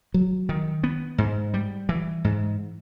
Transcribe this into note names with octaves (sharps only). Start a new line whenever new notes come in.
F#3
D#3
B3
G#2
G3
E3
G#2